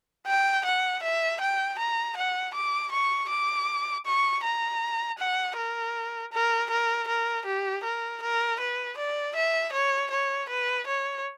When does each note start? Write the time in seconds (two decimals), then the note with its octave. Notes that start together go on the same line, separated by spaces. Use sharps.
0.26 G5
0.65 F#5
1.03 E5
1.41 G5
1.79 A#5
2.17 F#5
2.54 D6
2.92 C#6
3.29 D6
4.06 C#6
4.43 A#5
5.19 F#5
5.57 A#4
6.33 A#4
6.70 A#4
7.08 A#4
7.46 G4
7.84 A#4
8.22 A#4
8.60 B4
8.97 D5
9.36 E5
9.73 C#5
10.11 C#5
10.49 B4
10.87 C#5